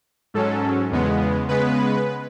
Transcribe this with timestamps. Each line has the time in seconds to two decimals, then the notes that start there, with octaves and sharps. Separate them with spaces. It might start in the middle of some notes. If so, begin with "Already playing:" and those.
0.34 G#2 F#3 C#4 A4
0.91 E2 C#3 G#3 B3
1.49 C#3 G#3 B3 B4